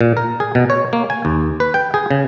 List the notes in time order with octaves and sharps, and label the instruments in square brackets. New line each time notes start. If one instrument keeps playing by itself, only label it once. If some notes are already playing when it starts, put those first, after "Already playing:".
[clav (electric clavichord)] A#2
A#4
G#4
B2
C#5
A#3
G#5
D#2
B4
G5
G#4
C#3